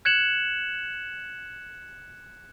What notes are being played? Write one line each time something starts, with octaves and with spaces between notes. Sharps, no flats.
F#6 G#6 C#7 E7 F#7